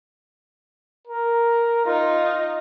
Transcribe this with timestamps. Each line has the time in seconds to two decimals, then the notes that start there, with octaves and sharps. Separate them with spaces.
1.07 A#4
1.86 D#4 F4